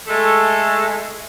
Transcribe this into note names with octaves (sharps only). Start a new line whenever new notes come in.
G#3 A3